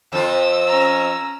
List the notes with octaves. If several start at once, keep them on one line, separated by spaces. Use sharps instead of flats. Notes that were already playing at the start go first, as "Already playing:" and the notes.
F2 F3 F4 E6
C#4 A#5